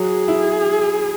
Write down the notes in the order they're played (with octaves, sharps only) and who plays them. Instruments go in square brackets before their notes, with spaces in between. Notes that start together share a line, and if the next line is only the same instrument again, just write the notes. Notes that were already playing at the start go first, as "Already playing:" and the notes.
Already playing: [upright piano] F#3 [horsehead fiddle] G#4
[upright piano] E4